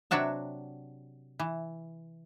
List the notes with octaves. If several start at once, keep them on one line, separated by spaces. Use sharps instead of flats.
C3 F#3 D4 F#4 E5
E3